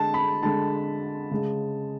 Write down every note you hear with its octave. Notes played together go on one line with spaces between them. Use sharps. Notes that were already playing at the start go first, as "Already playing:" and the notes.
Already playing: D3 G#3 A5
B5
D3 G#3 A5
C#3 G#3